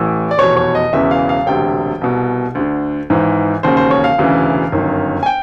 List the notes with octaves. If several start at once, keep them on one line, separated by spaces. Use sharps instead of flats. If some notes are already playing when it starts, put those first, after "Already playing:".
Already playing: A1 A2 E3
D5
F1 E2 B2 C#5
C#5
D#5
E1 E2 C#3 E3 E5
F5
F5
E1 D2 C3 G5
C2 B2
D2 D3
G#1 G#2 E3
E1 D#2 C#3 C5
C5
C#5
F5
E1 D2 C#3 E3
G1 F#2 D#3
G#5
G5